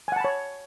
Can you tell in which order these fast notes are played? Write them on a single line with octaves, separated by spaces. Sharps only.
G#5 F#5 A5 B5 C#5